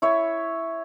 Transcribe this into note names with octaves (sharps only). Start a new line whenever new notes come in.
E4 C#5 E5